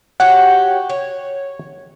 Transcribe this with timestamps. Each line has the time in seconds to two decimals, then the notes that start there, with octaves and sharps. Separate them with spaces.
0.20 F#4 G4 C#5 F#5
0.90 C#5